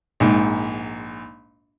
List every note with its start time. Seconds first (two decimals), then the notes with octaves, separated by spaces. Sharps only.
0.20 A#1 G#2